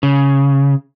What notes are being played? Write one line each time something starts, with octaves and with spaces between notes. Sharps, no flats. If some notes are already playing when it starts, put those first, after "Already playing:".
C#3